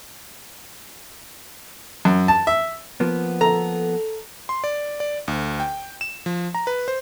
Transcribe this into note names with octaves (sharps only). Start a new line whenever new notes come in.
F#2
A5
E5
F3 A#3 B3
A4 A#5
C6
D5
D5
D2
G5
E7
F3
A#5
B4
C5